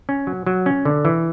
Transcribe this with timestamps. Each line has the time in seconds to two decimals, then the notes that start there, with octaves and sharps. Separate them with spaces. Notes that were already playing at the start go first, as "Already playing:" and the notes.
0.09 C#4
0.27 F#3
0.46 F#3
0.66 C#4
0.85 D3
1.05 E3